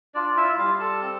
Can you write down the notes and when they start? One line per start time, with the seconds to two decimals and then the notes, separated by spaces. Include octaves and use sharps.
0.14 D4 F4 D5
0.36 E4 E5
0.58 G3 F4 F5
0.80 A4 A5
1.01 C4